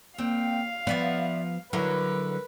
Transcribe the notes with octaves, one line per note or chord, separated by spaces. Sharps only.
A#2 C4 F5 G5
F3 B3 D5 E5 F#5
D3 F#3 E4 A#4 B4